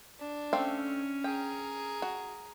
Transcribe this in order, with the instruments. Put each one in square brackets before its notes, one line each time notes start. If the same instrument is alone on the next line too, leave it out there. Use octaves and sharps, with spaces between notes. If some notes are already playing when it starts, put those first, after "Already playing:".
[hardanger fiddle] D4
[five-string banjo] A3 C4 F5 [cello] C#4
[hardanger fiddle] G#4 A#4 [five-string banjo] G5
[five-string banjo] F#4